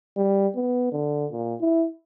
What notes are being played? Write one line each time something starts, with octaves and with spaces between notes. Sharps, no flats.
G3
B3
D3
A#2
E4